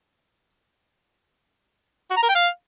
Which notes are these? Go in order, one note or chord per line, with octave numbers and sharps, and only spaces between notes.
F#4
A#5
A#4
G5
F5